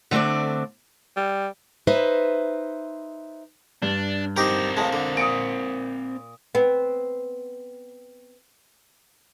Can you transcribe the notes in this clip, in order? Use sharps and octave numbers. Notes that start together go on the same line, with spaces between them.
D3 A3 C4 D4 D5
G3
D#4 B4 C5 E5
G2 D4
C4 D#4 G4 A#4 C5
A2 G#3 F5 A5
D3
A#2 D#6 C#7 D7
B3 C4